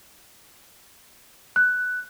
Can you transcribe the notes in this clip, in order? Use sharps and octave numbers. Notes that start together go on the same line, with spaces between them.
F#6